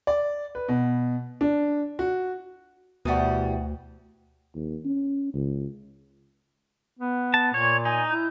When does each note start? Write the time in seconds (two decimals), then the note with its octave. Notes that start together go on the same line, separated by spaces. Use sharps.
0.07 D5
0.55 B4
0.68 B2
1.41 D4
1.99 F#4
3.05 D2 B2 E3 G3 F#4 A5 D#6
4.55 D#2
4.85 C#4
5.34 C#2
6.99 B3
7.34 A5
7.54 A#2 C#5 G#6
7.85 D#4 G#5
8.10 E4 G6